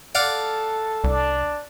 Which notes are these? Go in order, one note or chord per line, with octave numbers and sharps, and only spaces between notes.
A4 D5 F5 F#5
C2 D4